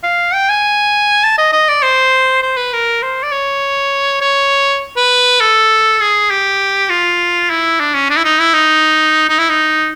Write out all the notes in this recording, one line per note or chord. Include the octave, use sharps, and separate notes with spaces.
F5
G5
G#5
A5
D#5
D#5
D5
C5
C5
B4
A#4
C5
D5
C#5
C#5
B4
A4
G#4
G4
F4
E4
D4
C#4
D4
E4
D#4
E4
D#4
D#4
E4
D#4